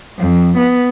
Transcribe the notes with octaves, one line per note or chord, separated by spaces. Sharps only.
F2
B3